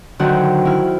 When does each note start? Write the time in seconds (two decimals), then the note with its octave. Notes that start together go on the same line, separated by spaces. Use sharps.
0.19 D3 D#3 F#3 C5 F#5
0.65 E4 F6